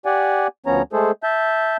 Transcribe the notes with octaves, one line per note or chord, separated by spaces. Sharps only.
G4 D5 F#5 G#5
D2 F3 B3 C#4 C#5 A#5
G#3 A3 G#4 A4 C5
E5 A5 G6